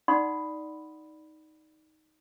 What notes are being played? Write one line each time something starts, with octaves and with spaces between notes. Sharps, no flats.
D#4 D5 F#5 B5 C6 D#6